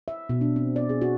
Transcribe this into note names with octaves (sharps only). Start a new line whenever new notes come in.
E5
B2
D4
C4
D5
G#4
F#4